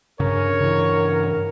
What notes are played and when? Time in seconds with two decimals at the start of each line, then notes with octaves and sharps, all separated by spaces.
0.20 G2 C#3 A#4 C#5
0.61 C#3 E3